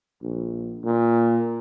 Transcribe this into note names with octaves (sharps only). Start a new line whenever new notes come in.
A#1
A#2